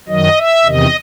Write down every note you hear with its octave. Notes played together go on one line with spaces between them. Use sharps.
F#2 D#3 F#3 D#5
E5
E2 C3 D#3 D#5